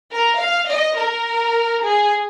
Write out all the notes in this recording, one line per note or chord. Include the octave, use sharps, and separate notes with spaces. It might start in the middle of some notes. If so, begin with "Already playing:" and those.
A#4
F5
D#5
A#4
G#4